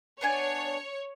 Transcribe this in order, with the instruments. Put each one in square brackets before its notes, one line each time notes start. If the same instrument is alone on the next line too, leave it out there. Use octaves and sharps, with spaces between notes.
[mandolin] B3 D4 G#5 [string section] C#5